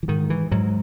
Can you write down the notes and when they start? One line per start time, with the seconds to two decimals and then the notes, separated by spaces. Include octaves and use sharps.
0.03 E3
0.08 G#2 D#3
0.30 E3
0.51 G#2 F#3